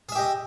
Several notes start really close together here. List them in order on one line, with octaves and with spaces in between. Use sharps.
G#4 E5 G4 D#5